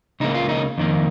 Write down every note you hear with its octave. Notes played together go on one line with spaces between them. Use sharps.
C#2 C#3 A#3 D#4
F4
D#4
F2 D#3 A#3